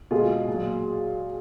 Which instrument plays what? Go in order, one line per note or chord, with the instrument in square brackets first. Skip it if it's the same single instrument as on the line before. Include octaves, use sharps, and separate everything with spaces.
[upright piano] B2 G#3 F4 G#4
A#2 F#3